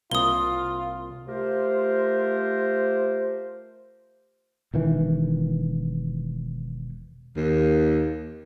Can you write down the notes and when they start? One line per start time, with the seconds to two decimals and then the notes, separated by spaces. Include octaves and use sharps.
0.11 C2 A#3 F4 D#6 G7
1.26 A3 F4 G4 A#4 C5
4.74 E1 D#3 E3
7.37 D#2